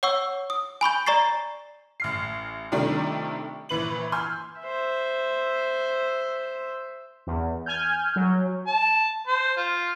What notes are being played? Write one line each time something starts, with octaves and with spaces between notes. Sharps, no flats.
C#5 F#5 C#6 E6
D#6
G#5 B5 C#6 G6
D5 A#5 C#6 A6 C7
A1 F6 C7
C3 D#3 F3 G3 A3 D4
A#1 E3 B4 F#7
G#5 C6 E6 F6 G6
C5 E5
E2
G#5 F6 G6
F#3
A5
C5
F4